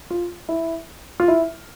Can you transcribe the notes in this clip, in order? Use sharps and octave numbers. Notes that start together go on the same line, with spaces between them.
F4
E4
F4
E4